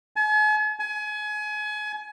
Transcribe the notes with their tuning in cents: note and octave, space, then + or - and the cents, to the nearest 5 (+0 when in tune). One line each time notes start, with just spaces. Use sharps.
G#5 +45
G#5 +30